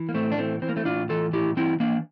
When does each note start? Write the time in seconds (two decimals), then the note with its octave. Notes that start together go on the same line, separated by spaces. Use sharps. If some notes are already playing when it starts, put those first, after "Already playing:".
Already playing: E3
0.09 A#3
0.14 A2 A3 C4
0.32 D4
0.38 E3 A3 C4
0.62 E3 C4
0.69 A#3
0.76 A3 C4
0.85 A2 D4 F4
1.09 E3 F4 A4
1.33 A2 E4 G4
1.57 E3 C4 E4
1.80 E3 A#3 D4